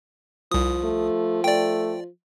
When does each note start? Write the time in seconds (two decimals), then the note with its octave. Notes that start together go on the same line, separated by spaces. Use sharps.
0.52 C2 F3 D#6
0.84 A3
1.44 A3 D5 G5